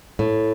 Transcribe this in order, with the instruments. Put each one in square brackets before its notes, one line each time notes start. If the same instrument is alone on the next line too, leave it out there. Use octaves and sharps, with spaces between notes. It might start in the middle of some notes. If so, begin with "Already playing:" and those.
[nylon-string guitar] A2